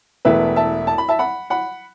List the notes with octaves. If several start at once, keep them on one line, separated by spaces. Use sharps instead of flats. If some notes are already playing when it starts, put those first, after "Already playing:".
E1 E2 E3 A3 B4 E5
E5 A5
A5
B5
E5 A5
F#5 B5
F#5 B5